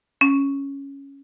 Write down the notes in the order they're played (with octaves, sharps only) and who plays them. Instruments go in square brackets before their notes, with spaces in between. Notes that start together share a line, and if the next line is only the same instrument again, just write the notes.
[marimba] C#4